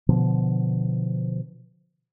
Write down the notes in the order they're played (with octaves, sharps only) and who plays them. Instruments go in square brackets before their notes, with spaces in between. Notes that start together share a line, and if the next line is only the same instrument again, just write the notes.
[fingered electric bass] B2 D3 F3